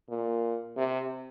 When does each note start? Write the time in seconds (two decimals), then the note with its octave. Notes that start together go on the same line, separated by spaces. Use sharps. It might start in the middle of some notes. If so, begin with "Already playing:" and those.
0.09 A#2
0.77 C3